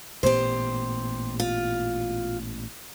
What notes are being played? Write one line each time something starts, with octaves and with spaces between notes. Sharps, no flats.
A1 A#2 B3 G4 C5
F4